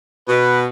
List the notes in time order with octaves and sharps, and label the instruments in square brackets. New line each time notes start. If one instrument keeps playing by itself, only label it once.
[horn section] B2 [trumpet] B4